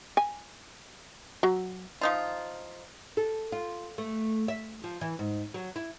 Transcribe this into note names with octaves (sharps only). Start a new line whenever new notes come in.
G#5
F#3
F3 D#4 F4
A4
F4
A3
E5
F3
E3
G#2
F#3
E4